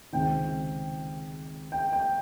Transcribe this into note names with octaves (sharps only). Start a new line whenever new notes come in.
C#2 C3 D#3 G5
G5
G5